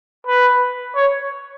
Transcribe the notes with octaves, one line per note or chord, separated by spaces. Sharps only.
B4
C#5